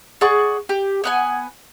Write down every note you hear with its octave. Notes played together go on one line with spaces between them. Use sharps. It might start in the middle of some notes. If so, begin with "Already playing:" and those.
G#4 D5 F#5 C#6
G4
B3 F#5 G#5